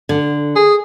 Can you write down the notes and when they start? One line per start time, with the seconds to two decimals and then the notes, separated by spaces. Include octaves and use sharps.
0.09 D3
0.56 G#4